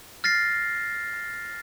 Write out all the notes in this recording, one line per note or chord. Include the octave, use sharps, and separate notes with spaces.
F6 A6 A#6 C7